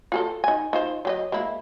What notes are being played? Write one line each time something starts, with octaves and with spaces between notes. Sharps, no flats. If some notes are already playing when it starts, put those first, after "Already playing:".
F4 G#4 A4
D#4 G#5
D#4 F4 C5
F#3 G4 D#5
G#3 A#3 E4